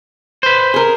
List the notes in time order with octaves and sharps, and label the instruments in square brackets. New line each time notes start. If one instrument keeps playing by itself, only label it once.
[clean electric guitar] B4 C5
[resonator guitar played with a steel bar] G#4 A#4